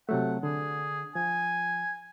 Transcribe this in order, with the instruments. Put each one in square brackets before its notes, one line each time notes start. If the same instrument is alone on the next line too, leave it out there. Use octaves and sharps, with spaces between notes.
[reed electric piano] C3 F#3 A3 [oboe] F#5
[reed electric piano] D3 [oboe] G#4
[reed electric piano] F3 [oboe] G#5